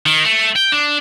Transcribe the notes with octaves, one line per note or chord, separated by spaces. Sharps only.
D#3
A3
G5
D4